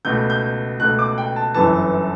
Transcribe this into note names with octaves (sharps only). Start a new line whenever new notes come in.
C#2 B2 A3 G6
G6
C#2 B2 A3 F#6
D6
G5
A5
G1 F#2 E3 A5